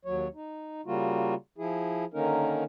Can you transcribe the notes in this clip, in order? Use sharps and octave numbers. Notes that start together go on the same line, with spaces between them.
D#2 F#3 C#5
D#4
C#3 G3 A#3 F4 F#4
F3 E4 G#4
D3 D#3 A#3 C#4 D#4 A#4